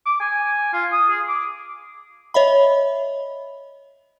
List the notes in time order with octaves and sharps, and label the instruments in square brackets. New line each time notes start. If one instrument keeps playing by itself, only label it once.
[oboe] D6
G#5
F4
D#6
G#4
D6
[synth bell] C#5 D#5 E5 B5